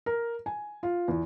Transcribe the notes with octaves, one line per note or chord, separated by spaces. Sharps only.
A#4
G#5
F4
E2